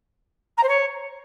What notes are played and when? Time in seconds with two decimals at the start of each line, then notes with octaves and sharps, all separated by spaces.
0.57 A#5
0.63 C5
0.68 C#5